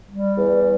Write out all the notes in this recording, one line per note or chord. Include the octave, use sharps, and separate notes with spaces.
G3
E2